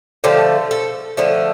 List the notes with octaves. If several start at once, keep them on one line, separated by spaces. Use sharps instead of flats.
D3 F3 A3 G4
A4
D3 F3 A3